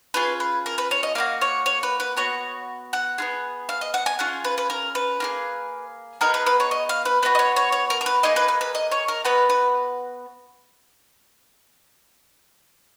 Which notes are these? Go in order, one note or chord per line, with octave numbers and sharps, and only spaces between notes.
C#4 F4 G#4 B4
B4
A#4
B4
C#5
D#5
A#3 D#4 F#4 F5
C#5
C#5
B4
B4
B3 F#4 C#5
F#5
B3 F4 G#4
F5
D#5
F#5
G#5
C#4 F4 G#4 F#5
B4
B4
A#4
B4
A#3 F4 G#4
B3 D#4 G#4 A#4
B4
B4
C#5
D#5
F5
B4
B3 D#4 F#4 B4
D#5
C#5
C#5
C#5
A#4
A#4
B4
A#3 D#4 G#4 D#5
B4
B4
B4
D#5
C#5
A#4
B3 F#4 B4
B4